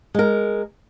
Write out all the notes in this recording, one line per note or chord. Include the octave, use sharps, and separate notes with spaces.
G#3 A#4